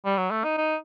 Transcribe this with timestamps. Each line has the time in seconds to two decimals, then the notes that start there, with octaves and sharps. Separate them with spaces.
0.05 G3
0.17 F#3
0.30 A3
0.44 D#4
0.58 D#4